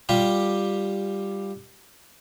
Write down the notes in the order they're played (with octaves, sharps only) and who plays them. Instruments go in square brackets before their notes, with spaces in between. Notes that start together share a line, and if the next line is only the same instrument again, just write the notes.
[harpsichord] G3 F4 G4